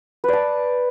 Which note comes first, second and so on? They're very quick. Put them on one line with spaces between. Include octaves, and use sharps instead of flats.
B4 D5 A5